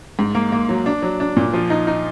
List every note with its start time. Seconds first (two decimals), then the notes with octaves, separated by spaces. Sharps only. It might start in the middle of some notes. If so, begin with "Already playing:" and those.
0.19 G#2
0.35 A#3
0.52 A#3
0.69 F#3
0.86 D4
1.03 F#3
1.20 D4
1.37 A#2
1.53 F3
1.70 D#4
1.87 D#4